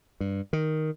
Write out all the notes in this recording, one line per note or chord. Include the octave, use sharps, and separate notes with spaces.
G2
D#3